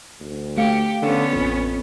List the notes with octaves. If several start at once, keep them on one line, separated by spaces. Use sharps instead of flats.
D2
A3 G4 F5 C#7
D3 B3 C#4
A1 F2 C4